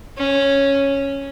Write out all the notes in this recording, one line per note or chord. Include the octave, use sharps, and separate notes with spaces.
C#4